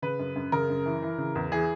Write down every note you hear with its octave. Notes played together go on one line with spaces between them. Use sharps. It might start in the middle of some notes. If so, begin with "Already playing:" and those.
C#3 B4
F#2
F#2
C#3 A#4
F#2
E3
E3
C#3
E2
E3 G#4